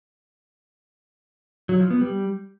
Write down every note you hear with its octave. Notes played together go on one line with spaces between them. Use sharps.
F#3
F3
B3
G3